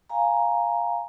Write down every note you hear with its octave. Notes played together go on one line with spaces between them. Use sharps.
F5 G#5 A#5